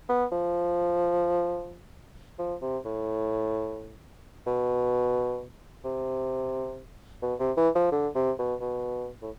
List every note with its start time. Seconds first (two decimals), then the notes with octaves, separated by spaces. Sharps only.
0.09 B3
0.32 F3
2.39 F3
2.62 C3
2.85 A2
4.47 B2
5.85 C3
7.22 B2
7.40 C3
7.57 E3
7.75 F3
7.92 D3
8.15 C3
8.39 B2
8.61 B2
9.22 A2